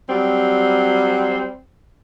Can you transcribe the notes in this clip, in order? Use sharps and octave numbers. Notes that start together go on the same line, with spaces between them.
F#3 G3 C4